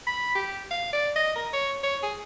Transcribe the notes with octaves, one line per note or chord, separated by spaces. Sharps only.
B5
G4
F5
D5
D#5
A#4
C#5
C#5
G#4